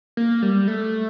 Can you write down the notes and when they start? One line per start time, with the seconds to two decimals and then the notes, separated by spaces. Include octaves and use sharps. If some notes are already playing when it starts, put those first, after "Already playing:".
0.17 A#3
0.42 G3
0.67 A3